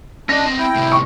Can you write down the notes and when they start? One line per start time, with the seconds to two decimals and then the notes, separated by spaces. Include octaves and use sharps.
0.29 C#4 D4 D#5 A#6
0.46 B3 C4
0.58 E4 G5
0.76 A2 C3
0.92 C#6